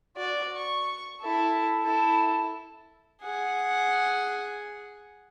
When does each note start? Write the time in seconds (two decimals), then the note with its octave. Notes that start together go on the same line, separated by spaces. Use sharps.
0.16 F#4 D5
0.56 C#6
1.21 E4 A4
1.83 E4 A4
3.23 G#4 F#5